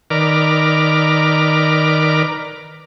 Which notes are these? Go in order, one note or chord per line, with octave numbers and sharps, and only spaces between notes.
D#3 A#4 B4 D5 D6 F6